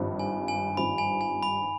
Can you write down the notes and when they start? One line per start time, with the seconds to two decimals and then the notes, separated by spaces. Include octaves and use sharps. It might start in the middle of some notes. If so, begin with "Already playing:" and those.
Already playing: G#1 G2 F3 C4
0.19 G#5
0.48 G#5
0.77 G#1 G2 F3 C4 B5
0.98 G#5
1.21 G#5
1.43 B5